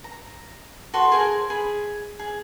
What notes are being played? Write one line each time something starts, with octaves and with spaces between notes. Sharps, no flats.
A#5
F#4 A4 C6 C#6
G#4 A#4 C5 G#5
G#4 B5
G#4